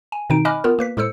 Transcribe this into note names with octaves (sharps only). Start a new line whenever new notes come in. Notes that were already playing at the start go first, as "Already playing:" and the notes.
G#5
B2 D#3 C4 D#4 D7
D#5 G#5 B5 D6 F6 F#6
B3 F4 A#4
A#3 B4 B6
A2 G#3 A4 C5 E6 C#7